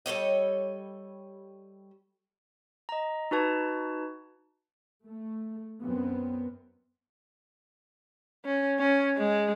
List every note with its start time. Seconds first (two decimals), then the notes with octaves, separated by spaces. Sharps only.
0.06 G3 A4 C#5 D#5
2.89 D#5 A#5
3.31 D#4 F#4 B4 A5 G#6
5.06 A3
5.81 F#2 B3 C4
8.45 C#4
8.79 C#4
9.18 G#3